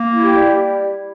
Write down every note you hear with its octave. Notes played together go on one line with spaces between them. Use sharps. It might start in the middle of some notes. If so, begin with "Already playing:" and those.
Already playing: A#3
E4
G4
G3